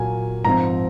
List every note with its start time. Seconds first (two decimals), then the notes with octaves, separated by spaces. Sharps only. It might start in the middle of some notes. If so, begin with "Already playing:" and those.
Already playing: A#2 F#3 A#3 G#5
0.45 G#2 F3 C4 A#5